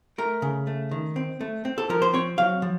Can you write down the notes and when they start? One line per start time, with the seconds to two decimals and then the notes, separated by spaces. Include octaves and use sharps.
0.18 A3 A#4
0.42 C#3
0.67 A3
0.91 D#3
1.16 C4
1.41 A3
1.65 C4
1.78 A4
1.89 F3 A#4
2.02 C5
2.14 C4 C#5
2.38 F#3 F5
2.62 F3